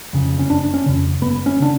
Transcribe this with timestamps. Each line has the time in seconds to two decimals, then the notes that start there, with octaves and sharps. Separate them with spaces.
0.13 F2 C#3
0.39 C#4
0.49 F#1 D4
0.74 C#4
0.86 F2 C#3
1.21 F#1 B3
1.46 C#4
1.60 C#3 D4